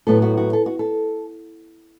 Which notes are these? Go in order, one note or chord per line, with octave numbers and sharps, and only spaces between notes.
A2 F#3 B3 A4
F#4
F#4
A4
F#4
A4